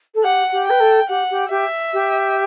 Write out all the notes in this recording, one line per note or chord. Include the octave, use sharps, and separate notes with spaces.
A4
G4 F#5
G4
B4 G5
A4
G4 F#5
G4
G4 E5
G4